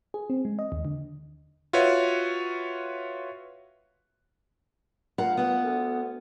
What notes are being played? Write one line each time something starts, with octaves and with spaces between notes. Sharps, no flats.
G#4
C4
G#3
D#5
D#2
D3
F4 F#4 B4 C#5 E5
A#2 F5 F#5 A#5
B3 F#5
D2